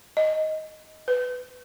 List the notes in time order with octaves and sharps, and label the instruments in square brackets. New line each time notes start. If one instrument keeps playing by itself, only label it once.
[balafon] D#5
B4